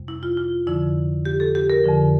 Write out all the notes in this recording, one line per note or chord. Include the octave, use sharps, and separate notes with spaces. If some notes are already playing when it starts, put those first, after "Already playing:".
Already playing: F2 C3 G3
E4
F4
F4
F2 D3 F3 E4
G4
A4
G4
A#4
F2 D3 F3